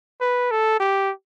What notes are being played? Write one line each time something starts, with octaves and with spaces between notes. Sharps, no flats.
B4
A4
G4